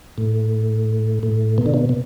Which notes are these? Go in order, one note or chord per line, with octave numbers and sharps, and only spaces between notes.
A2
A2
B2
D3
B2
B2